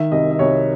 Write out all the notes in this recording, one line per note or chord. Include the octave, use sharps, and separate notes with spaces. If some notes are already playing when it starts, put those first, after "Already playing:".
Already playing: D#3 E5
C2 D#5
D#5
C2 C#5